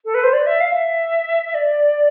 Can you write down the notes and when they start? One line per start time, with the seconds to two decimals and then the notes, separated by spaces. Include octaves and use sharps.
0.05 A4
0.14 B4
0.23 C5
0.33 D5
0.46 E5
0.60 F5
0.73 E5
1.54 D5